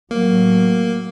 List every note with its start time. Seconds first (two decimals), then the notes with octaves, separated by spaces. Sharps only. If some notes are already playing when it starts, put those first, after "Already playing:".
0.11 A2 F#3 A#3